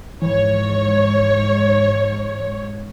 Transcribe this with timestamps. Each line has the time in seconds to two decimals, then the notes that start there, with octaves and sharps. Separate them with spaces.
0.22 G#2 E3 C#5